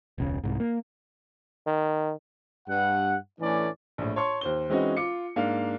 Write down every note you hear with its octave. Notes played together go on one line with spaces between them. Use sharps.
E1 C#2 C#3
C2 G#2
A#3
D#3
G2 F#5
A2 E3 A3 C#4 D4 D5
A#1 A2
C#5 A5 C6 C#6
D#2 C5 G7
E3 G#3 C4 C#4 D#4 F#4
F4 D6 C#7
G#2 A#3 D4 F5